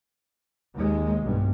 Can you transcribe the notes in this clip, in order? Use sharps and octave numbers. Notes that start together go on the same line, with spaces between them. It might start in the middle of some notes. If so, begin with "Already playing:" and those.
D#2 G#3
B1 G2